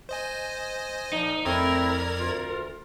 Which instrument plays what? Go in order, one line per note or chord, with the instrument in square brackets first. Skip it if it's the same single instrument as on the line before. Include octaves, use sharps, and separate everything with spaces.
[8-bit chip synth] C5 D#5 G#5
[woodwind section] A#2 F3 [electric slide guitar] D#4
[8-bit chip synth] F2 D5 G#6 [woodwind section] A3 C4 E4 [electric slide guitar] A#4
[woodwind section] D2 F4